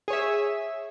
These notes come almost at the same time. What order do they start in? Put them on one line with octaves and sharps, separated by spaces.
G#4 C#5 E5